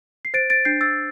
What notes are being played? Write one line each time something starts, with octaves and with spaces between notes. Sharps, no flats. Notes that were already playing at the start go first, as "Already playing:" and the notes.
C7
C5 A6 D7
A6 D7
D4 G6 C7
E6 A6